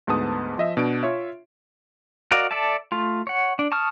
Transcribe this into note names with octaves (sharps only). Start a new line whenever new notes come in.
D2 G#2 B3 A5 D#6
F3 D#5 E5
B2 D4 D7
F4 C#5 E5
F#4 A#4 D5 D#5 F5
A4 D5 E5 A5
A3 F4
C#5 F#5
D4
A5 C#6 D#6 F6